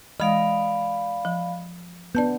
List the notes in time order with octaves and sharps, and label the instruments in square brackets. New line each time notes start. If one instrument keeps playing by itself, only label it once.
[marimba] E3 G#3 [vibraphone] D5 F5 B5 [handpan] D#5
[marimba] F3
[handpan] B3 D4 [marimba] D5 A5 G6